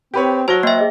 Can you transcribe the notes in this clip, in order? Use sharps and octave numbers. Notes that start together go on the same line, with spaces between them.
C4 G4 B4 C#5
F#3 F#4 C5 C#5 A5 A#6 G7
A#3 D#5 E5 G5 C6
G#4 D#5 G5